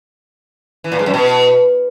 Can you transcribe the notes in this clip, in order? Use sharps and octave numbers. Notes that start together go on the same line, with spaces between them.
E3
A#2
G#2
F#2
B2